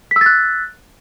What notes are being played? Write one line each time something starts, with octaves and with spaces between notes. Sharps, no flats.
E6 F#6 A6 B6